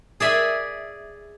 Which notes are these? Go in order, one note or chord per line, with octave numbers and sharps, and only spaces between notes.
G#4 D5 E5 G#5